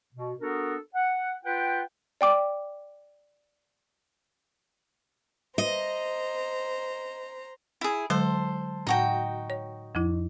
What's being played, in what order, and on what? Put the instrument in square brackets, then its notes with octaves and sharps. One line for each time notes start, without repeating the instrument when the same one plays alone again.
[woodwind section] B2
B3 D4 F#4 A4 A#4
F#5
F4 B4 F#5 G5
[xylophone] D5 G5 D6
[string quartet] C5 A#5 [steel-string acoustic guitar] D#5
[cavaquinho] E4 G#4
[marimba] D3 F#3 G#3 [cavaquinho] A4 C5
[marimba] A2 A5 A#6 [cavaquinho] D#4 F#4 G5
[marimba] C#5
F2 F3 E4